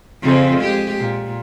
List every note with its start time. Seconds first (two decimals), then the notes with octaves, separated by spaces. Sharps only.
0.23 F2 C#3 C4
0.60 G#3 G4
0.98 A#2